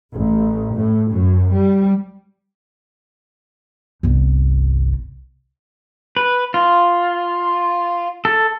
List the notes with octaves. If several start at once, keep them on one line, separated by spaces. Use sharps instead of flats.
A1
A2
F#2
G3
G1 C2
B4
F4
A4